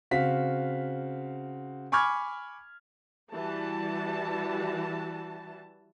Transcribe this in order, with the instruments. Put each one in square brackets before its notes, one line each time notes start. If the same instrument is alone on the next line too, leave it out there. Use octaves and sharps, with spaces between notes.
[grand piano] C#3 C4 F#4 F5 B6
G#5 B5 C#6 D6 F6 G#6
[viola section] E3 G3 F#4 A5